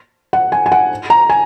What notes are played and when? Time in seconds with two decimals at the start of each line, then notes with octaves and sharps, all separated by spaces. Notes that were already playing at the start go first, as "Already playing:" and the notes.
0.33 F#5
0.52 G#5
0.66 G#5
0.72 F#5
1.10 A#5
1.30 G#5